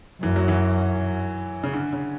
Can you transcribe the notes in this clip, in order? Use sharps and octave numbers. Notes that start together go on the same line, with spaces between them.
F#2 E3
F#3
E3
C#3
D3
C#3